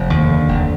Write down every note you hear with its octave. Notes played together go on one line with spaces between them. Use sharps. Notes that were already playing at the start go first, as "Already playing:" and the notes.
Already playing: F1 F3
D#2
D3
F1